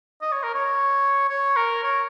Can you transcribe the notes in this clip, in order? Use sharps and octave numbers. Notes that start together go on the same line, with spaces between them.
D#5
C#5
A#4
C#5
C#5
A#4
C#5